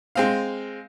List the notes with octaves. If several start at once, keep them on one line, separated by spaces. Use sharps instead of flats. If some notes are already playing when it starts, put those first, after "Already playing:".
G#3 C4 F5